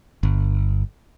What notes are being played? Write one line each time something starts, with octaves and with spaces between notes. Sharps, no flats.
G1